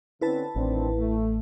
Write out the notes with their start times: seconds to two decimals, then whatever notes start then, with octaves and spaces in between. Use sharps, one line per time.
0.21 D3 C4 C#4 E4 B4 A5
0.56 A1 D#3 C4 D4
0.98 A3